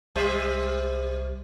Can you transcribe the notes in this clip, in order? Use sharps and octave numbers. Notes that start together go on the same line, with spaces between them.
C2 G3 C5 E5